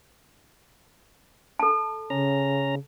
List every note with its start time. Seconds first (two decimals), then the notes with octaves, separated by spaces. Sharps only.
1.59 A4 A5
2.10 C#3 C#4 A#5